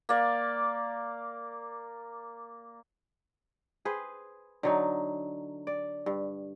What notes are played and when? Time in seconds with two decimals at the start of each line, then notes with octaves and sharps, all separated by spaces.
0.09 A#3 D5
3.85 G#4 B4 C5
4.63 D3 F#3 D#4
5.67 D5
6.06 G2